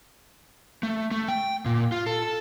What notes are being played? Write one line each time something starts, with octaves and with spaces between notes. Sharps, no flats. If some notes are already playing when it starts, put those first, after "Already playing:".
A3
A3
G5
A#2
F4
A4